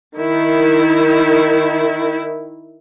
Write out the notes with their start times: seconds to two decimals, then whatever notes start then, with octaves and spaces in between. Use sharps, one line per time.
0.17 D#3 E4